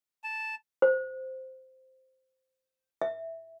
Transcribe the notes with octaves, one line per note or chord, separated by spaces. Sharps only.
A5
C5
E5